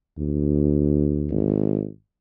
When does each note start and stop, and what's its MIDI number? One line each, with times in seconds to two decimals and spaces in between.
0.18 1.56 38
1.30 1.87 32